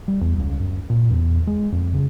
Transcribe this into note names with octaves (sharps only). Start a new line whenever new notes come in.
G3
E2
C#2
F#2
A#2
E2
G#3
F2
C#3